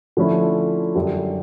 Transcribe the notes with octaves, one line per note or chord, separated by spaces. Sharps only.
D3 F3 A3 C#4 E4
F#2 D3 G3